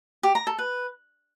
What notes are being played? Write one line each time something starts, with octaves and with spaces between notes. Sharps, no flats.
G4
A#5
A4
B4